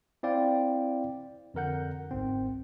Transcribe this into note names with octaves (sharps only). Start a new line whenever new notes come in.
C4 E4 D5 F5 G5
F2 D3 A#4 F#5 G6
G1 C2 G#2 C4